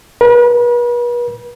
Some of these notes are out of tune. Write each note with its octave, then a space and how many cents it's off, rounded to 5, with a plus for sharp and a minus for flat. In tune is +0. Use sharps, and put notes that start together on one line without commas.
B4 -40